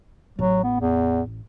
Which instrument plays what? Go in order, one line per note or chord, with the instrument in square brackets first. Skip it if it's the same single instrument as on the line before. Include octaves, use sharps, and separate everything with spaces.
[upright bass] A1 [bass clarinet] F#3
[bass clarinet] B3
E2